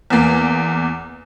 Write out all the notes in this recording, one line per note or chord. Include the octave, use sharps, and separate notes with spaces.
E2 A#3